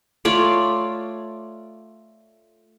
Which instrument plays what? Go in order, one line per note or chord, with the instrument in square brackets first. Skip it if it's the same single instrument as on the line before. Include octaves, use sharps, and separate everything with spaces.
[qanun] A3 F4 C#5 D5